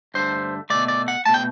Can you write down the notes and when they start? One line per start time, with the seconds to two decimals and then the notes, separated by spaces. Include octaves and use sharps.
0.14 G2 D3 A3 C5
0.70 B2 A3 D5
0.88 D5
1.08 F#5
1.26 B2 A3 A5
1.34 G5